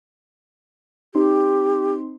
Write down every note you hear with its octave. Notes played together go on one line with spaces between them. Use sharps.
C4 D#4 G4 C6